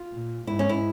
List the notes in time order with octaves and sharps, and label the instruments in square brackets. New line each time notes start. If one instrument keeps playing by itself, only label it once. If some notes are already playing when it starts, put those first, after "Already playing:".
Already playing: [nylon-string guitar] F4
[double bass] A#2
[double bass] G#2 [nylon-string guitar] E4
[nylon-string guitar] C#4
E4